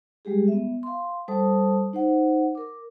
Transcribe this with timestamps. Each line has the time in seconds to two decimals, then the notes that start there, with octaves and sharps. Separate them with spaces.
0.25 G3 G#3 G4 G#4
0.48 B3 E5
0.83 F5 C6
1.28 G3 A4 C5 A5 D#6
1.93 D#4 C5 F#5
2.55 A#4 D6